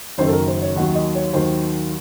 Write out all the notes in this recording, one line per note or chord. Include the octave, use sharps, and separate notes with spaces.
F#1 F#2 D#3 F#3 C5
A4
A#4
C5
C#5
D#2 D#3 F#3 F#5
D#5
C#5
D#2 D#3 F#3 C5